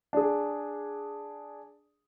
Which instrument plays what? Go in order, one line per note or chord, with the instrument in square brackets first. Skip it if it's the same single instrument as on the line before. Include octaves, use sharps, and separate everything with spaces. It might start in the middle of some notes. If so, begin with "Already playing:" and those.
[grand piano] D4 G#4